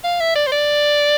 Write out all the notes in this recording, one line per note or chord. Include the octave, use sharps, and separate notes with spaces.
F5
E5
D5
C5
D5